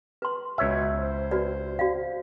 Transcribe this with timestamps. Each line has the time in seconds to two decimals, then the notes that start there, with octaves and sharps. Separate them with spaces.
0.22 B4 C6
0.58 C#2 B2 C#5 E5
1.00 C5
1.31 F#4 B4 D5
1.79 F#4 D5 F5